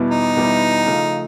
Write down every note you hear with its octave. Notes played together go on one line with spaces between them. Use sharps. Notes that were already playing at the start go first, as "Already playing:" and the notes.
Already playing: E2 B2 G3 B3 E4
D#4
E2 B2 G3 B3 E4
C#3 F3 A3